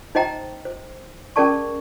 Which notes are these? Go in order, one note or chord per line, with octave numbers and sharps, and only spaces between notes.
D#4 C5 D#5 G5 A#5
C5
C#4 G#4 A#4 D5 A5 C#6